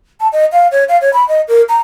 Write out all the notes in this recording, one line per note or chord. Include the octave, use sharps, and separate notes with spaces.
A5
D#5
F5
C#5
F5
C#5
B5
D#5
A#4
A#5